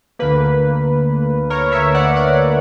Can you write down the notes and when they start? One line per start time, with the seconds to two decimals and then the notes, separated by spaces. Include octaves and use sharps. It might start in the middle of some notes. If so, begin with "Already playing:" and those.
0.19 D2 D3 A#3 B4
1.50 A#4 C#5
1.72 C#5 E5
1.95 D5 F#5
2.16 D5 F#5